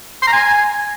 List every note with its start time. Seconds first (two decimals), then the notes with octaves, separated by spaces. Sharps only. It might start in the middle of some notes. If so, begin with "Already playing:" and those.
0.22 C6
0.28 A#5
0.33 G#5